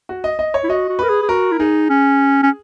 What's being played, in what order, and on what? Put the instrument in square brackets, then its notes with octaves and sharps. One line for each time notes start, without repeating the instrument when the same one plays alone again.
[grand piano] F#4
D#5
D#5
C#5
[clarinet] E4
[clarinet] F#4 [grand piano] D#5
[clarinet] F#4
[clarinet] A#4 [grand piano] B4
[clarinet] G#4
G#4
[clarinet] F#4 [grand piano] A#4
[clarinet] E4
[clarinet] D#4 [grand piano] G#4
[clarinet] C#4
C#4